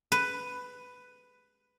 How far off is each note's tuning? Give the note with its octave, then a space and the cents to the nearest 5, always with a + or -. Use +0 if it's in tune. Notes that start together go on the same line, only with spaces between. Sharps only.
B4 +10